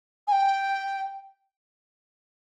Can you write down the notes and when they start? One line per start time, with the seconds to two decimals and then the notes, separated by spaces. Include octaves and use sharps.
0.28 G#5
0.32 G5